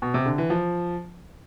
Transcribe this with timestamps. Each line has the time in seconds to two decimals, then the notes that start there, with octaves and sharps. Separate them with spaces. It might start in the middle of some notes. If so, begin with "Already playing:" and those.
0.02 B2
0.14 C3
0.26 D3
0.38 E3
0.50 F3